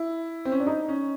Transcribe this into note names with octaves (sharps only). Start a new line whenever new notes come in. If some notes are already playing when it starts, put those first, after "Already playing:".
Already playing: E4
C4
C#4
D4
D#4
C#4